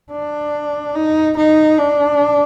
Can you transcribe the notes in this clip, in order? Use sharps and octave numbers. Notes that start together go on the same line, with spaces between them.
D4
D#4
D#4
D4